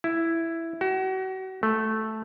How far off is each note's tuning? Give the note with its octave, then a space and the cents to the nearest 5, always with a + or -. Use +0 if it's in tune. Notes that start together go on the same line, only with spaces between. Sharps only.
E4 +5
F#4 +35
A3 -5